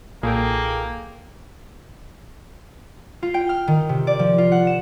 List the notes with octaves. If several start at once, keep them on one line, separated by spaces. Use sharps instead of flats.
B1 A#2 A#3 G#4 A4 G5
F4
G5
F6
D#3
C3
D5
F3
F4
F#5
E7